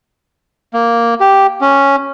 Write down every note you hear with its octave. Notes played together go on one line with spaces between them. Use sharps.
A#3
G4
C#4